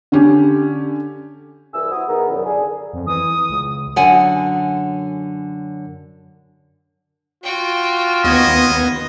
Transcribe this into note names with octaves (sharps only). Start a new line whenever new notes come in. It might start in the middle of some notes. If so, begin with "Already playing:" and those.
D3 C#4 G4
C2 E3 G#4 E6
E4 F#4 C5 D#6
D#3 E3 B3 G#4 A#4
C2 F#2
D3 G#4
F2
E3 D#6
C#2
F#2 D3 F#5 G#5
F4 F#4 G5
D#2 B3 D#5 G#6